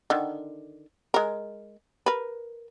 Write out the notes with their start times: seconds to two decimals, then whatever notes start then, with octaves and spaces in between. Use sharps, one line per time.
0.10 D3 D#3
1.14 G#3 A#4
2.06 A#4 B4